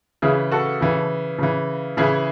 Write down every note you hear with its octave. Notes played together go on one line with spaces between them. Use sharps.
C#3 E3 E4 G#4
F#4 A4
C#3 E3
C#3 E3
C#3 E3 E4 G#4